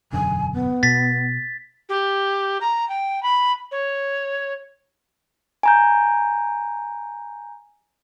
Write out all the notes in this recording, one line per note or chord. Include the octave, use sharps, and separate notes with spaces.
E1 F#2 D3 G#5
B3
B2 A6 B6
G4
A#5
G5
B5
C#5
G#5 A#5 G6